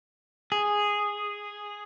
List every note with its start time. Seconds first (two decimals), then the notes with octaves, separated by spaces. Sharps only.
0.52 G#4